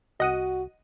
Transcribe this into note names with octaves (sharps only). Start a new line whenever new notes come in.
C2 F#4 D#5 F#5 D#7